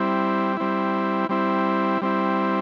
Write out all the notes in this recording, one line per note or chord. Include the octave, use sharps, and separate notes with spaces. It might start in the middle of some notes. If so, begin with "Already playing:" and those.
Already playing: G3 C4 E4
G3 C4 E4
G3 C4 E4
G3 C4 E4